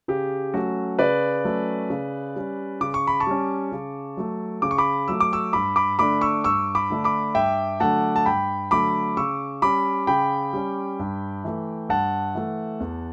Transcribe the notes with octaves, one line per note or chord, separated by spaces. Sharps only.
C#3 G4
F#3 A3 C#4 F#4
C#3 B4 D5
F#3 A3 C#4
C#3
G3 C#4
C#3 D6
C#6
B5
A5 C#6
G3 C#4
C#3
F#3 A3
C#3 D6
C#6
B5 D6
F#3 A3 E6
D6
C#6 E6
G2 B5 D6
B5 D6
D3 A3 D4 B5 D6
C#6 E6
G2 C#6 E6
B5 D6
D3 A3 D4
B5 D6
G2 E5 G5
D3 F#3 A3 F#5 A5
A5
G2 G5 B5
D3 F#3 A3 B5 D6
C#3 C#6 E6
G3 C#4 B5 D6
C#3 G5 B5
G3 C#4
G2
E3 A3
G2 F#5 A5
E3 A3
E2